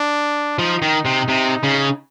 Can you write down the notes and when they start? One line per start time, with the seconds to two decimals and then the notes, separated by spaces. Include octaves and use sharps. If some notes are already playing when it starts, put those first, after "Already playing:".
Already playing: D4
0.59 F3 D#4
0.82 D#3
1.05 C3
1.28 C3
1.63 C#3